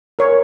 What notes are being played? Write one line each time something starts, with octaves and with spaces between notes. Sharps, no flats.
A#4 C#5